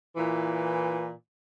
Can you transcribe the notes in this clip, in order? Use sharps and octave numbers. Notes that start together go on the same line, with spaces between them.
A#2 E3